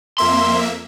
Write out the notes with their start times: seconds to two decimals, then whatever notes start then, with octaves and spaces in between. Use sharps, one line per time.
0.18 F2 A#3 E5 C6